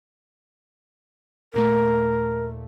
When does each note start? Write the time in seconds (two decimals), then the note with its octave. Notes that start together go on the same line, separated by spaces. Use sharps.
1.54 D#2 A#2 A3 A#4